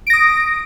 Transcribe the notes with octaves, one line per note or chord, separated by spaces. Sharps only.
D#6 A#6 D7